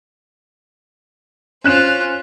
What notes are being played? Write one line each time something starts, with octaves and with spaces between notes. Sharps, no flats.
C#4 F4 C5 F#6 E7